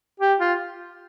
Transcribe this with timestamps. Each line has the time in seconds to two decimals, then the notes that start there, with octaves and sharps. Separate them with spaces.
0.20 G4
0.40 F4